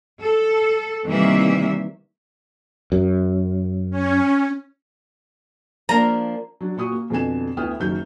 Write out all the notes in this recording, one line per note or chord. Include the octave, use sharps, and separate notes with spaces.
A4
C3 D#3 E3 G3 A#3 E5
F#2
C#4
F3 A#3 D4 A#5
F#3 D4
A#2 F#4 C#6 D#6
A#3
F2 B2 D3 G#5 E7
D2 B3 E4 G5 D#6 F6
F#1 D#3 F#3 G6